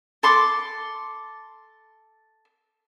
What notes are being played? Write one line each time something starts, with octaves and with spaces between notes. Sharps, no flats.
A4 C6 D6